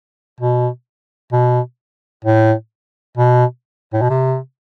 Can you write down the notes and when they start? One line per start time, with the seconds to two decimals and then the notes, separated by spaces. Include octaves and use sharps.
0.41 B2
1.33 B2
2.25 A2
3.17 B2
3.94 A2
4.02 B2
4.10 C3